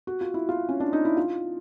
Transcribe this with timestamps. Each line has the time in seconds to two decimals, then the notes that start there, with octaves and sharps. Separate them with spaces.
0.07 F#4
0.21 F4
0.34 E4
0.49 F4
0.69 C#4
0.80 D4
0.93 D#4
1.05 E4
1.17 F4